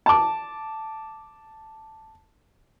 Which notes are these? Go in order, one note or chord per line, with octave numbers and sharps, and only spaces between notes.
A5 D6